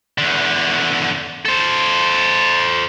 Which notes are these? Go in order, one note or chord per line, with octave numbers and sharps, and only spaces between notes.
E2 D3
A4 C5